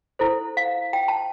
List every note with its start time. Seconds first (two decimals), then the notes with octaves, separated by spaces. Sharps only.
0.19 E4 A4 C5
0.57 F5
0.93 G5
1.08 A5